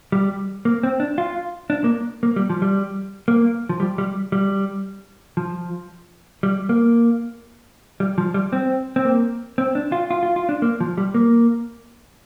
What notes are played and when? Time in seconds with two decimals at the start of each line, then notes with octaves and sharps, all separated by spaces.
0.12 G3
0.65 A#3
0.83 C4
1.00 D4
1.18 F4
1.70 D4
1.84 A#3
2.23 A#3
2.36 G3
2.50 F3
2.62 G3
3.28 A#3
3.69 F3
3.80 G3
3.98 G3
4.32 G3
5.37 F3
6.43 G3
6.69 A#3
8.00 G3
8.18 F3
8.34 G3
8.53 C4
8.96 C4
9.05 A#3
9.58 C4
9.75 D4
9.92 F4
10.11 F4
10.23 F4
10.36 F4
10.49 D4
10.62 A#3
10.81 F3
10.98 G3
11.14 A#3